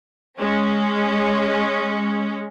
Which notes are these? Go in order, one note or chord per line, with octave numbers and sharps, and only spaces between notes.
G#3 C#4